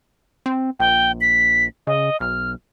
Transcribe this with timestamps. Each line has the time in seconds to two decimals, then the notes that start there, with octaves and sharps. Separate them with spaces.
0.46 C4
0.80 A#1 G5
1.21 B6
1.87 C#3 D#5
2.20 B1 F6